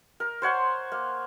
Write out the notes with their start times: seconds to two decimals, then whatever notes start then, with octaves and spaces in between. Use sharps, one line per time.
0.20 A#4
0.42 C5 C#5 F#5 C6
0.92 A#3